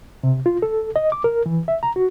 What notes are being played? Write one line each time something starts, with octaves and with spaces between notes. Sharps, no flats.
C3
F4
A4
D#5
D6
A#4
E3
E5
A#5
F#4